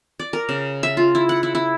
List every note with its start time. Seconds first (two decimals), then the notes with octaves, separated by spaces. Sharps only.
0.20 D5
0.33 A#4
0.49 C#3
0.83 E5
0.97 F4
1.15 E4
1.29 F#5
1.43 E4
1.55 E4